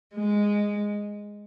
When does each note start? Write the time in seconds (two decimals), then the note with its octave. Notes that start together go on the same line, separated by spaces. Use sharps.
0.15 G#3